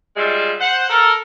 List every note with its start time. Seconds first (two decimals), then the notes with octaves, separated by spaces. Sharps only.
0.17 G3 G#3 F4 E5
0.60 C5 F#5
0.90 A4 A#4